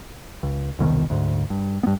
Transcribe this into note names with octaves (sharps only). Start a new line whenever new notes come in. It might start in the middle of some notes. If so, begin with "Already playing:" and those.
C#2
E1 C2 B2 D#3
D2 G#2
G2
G2 B3